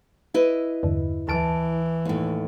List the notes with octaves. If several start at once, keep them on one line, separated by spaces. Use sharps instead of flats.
E4 B4 D#5
E2 G2 D3
D2 E3 A5 D7
D#2 A2